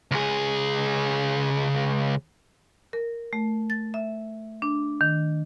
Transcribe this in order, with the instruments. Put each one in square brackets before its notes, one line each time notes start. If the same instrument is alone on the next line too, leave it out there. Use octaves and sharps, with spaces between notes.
[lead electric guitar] C#2 G#4
[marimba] A#4
A3
A6
E5
D4
D#3